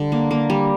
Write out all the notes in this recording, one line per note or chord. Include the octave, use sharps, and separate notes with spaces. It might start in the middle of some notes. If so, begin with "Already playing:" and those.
Already playing: D3 G3
A#3
A#3
G3